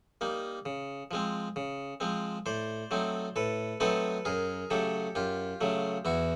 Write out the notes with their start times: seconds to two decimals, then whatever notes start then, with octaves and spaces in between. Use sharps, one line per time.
0.21 G3 A#3 D#4
0.65 C#3
1.11 F3 G#3 C4
1.56 C#3
2.00 F3 G#3 C4
2.46 A2 C5 D5
2.91 F#3 A3 C4 D#4
3.36 A2 A4 B4
3.80 F#3 A3 C4 D#4 A4 B4
4.25 F#2 G#4 A#4
4.70 C#3 F#3 A3 G4 A4
5.15 F#2 F4 G4
5.61 C#3 F#3 A3
6.05 E2 E4 F#4